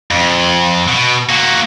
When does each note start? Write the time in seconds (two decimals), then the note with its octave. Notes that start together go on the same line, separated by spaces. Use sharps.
0.11 F2
0.88 B2
1.29 A#3 F#4